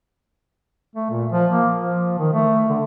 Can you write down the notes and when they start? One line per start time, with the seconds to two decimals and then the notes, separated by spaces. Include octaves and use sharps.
0.96 A3
1.10 A#2
1.32 F3
1.52 A#3
1.74 F3
2.18 D#3
2.34 A3
2.69 D3